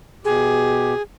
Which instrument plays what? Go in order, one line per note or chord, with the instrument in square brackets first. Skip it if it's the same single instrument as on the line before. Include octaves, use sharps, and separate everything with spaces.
[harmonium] B2 G4 [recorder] G#4